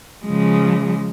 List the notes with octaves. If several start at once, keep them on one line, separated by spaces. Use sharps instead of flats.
C#3 F3 G#3